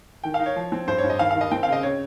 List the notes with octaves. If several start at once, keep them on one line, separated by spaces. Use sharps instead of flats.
D#3 G5
F5
D#4
C#5
F3
C4
G2 C5
C#5
G2
D#5
D#3 F5
F5
D#3
D#5
C4 G5
F5
C#3 D#5
C#3 C#5